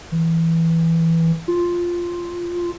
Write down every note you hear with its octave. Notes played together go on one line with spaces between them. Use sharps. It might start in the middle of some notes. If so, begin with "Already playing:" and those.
E3
F4